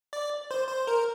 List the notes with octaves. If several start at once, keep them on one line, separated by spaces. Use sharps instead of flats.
D5
C5
C5
A#4